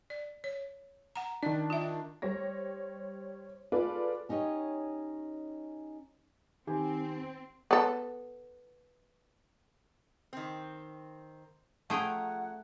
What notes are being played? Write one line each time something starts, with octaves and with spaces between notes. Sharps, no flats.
D5
C#5
F#5 A#5
D#3 D4 D5
F4 E5
G3 C5 C#5 A#6
F4 G#4 A4 B4 D5
C#4 D#4 G4 C#5 D#5
D#3 C4 G4 G#5
B3 A4
D#3 C4
F3 A3 C#4 G#4 F#5 G5 A#5